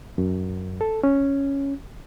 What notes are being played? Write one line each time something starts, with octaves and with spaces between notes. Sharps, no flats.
F#2
A4
C#4